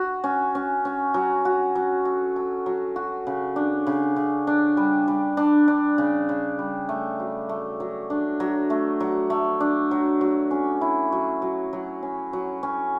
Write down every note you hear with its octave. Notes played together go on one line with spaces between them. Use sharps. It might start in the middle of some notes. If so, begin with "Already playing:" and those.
Already playing: F#4
C#4
C#4
C#4
F#3
F#4
F#3
A4
A4
F#3
F#4
C#3
D4
C#3
C#3
D4
G3
G3
D4
D4
C#3
C#3
G3
A3
F#3
A3
F#3
D4
F#3
A3
F#3
A3
D4
F#3
F#3
C#4
E4
F#3
F#3
F#3
C#4
F#3
C#4